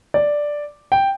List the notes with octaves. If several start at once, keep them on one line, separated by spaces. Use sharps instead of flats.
D5
G5